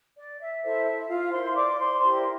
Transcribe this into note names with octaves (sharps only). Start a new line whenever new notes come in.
D5
E5
E4 A4 C5 E5
E5
F4 F5
E4 A#4 C5 C6
D5 D6
C5 C6
E4 G4 A#4 C5 C6